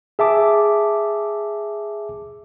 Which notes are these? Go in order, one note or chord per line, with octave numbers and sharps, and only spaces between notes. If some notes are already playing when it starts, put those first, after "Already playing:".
G#4 E5 A5 D6